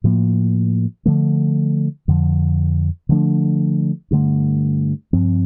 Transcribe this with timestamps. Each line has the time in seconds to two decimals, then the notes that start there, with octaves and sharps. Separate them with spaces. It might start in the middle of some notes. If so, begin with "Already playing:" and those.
0.04 A2 F3 A#3
1.06 D3 F3 A3
2.08 F2 D3 F3
3.09 D3 F3 A3 D4
4.11 G2 D3 A3
5.13 G2 F3 C4